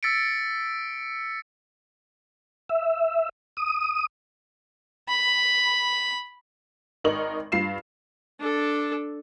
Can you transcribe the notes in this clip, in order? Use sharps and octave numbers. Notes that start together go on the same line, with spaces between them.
E6 A6 B6 C#7 D7
E5
D#6
B5
G#1 D#4 A#4 C#6 F#7
G2 F4 C7 E7
D4 A4